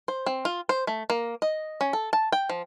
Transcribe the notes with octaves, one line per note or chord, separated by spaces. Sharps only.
C5
C4
F4
C5
A3
A#3
D#5
C#4
A4
A5
G5
F3